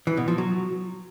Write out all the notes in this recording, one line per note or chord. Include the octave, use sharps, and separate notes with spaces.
E3
B2
F3
F#3